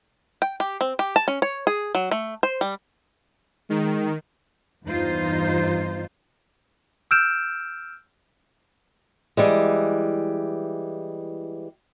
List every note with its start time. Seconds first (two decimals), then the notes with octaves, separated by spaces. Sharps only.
0.42 G5
0.60 G4
0.81 C4
0.99 G4
1.16 A5
1.28 C#4
1.42 C#5
1.67 G#4
1.95 F#3
2.11 A3
2.43 C5
2.61 G3
3.70 D#3 G#3
4.84 E2 G2 E3 D#4 F4 C5
7.11 E6 F6 G6 D7 E7
9.37 E3 G3 G#3